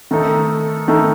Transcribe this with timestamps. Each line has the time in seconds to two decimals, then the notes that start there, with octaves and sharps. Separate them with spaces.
0.11 D#3 A3 D#4 A4
0.88 D#3 A3 D#4 A4